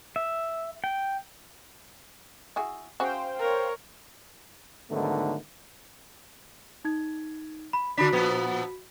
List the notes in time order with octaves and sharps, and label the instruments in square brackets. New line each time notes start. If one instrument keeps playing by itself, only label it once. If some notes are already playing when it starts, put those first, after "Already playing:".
[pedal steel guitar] E5
G5
[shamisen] E4 F#4 G#4
[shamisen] C#4 F#4 G#4 [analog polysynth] C5 F5 G5
[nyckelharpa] A#4 C#5
[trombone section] G#2 D3 D#3 F#3 A3 B3
[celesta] D#4 G#6
B5
[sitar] D3 D4 [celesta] F#4 B5 B6
[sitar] A#2 F3 B3